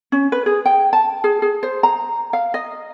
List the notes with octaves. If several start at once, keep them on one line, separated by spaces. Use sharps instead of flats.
C#4
B4
G#4
G5
A5
G#4
G#4
C5
A#5
F5
D#5